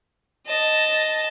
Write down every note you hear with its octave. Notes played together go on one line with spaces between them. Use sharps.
D#5 A5